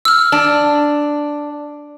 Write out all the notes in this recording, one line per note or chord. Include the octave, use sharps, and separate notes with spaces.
E6 F6
D4